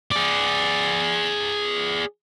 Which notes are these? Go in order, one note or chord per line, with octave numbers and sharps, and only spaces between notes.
G#4 D5